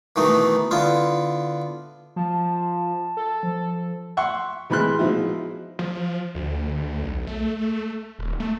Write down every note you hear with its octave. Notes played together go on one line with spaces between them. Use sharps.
B2 D#3 E3 A3 B3 D#4
D3 B3 E4 F4
F3 A5
A4
F3
E5 F#5 C6 C#6
C3 E3 G#3 B5 C6 F#6
B2 F3 G#3 D#4 E4
F3
D2
B1
A3
D#1
A3